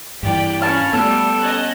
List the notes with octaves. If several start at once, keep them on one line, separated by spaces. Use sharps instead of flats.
G2 E3 G4 D5 G5
C#4 C#5 F5 A5 B5 F6
G3 A3 B3 A4
C#4 D#5 A5 F#6